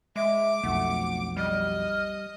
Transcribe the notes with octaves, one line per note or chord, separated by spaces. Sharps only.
G#3 E5 D6
B1 F2 A3 F#5
G3 D#5 F6